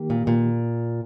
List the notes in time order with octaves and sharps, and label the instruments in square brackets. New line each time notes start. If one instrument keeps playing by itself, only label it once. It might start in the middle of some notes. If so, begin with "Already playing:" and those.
Already playing: [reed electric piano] D#3 A#3 G4
[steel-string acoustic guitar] A#2
A#2